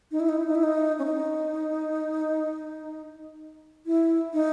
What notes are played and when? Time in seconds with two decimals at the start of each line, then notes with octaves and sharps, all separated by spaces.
0.12 D#4
0.20 E4
0.29 D#4
0.37 E4
0.46 D#4
0.55 E4
0.63 D#4
0.99 C#4
1.05 D#4
3.86 E4
4.33 D#4